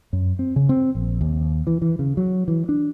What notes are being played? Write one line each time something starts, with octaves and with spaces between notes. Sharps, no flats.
F#2
C4
C#3
C4
A#1
D#2
E3
E3
C#3
F#3
E3
D4